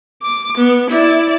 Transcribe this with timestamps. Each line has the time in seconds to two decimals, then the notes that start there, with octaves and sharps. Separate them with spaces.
0.22 D6
0.58 B3
0.90 E4 D5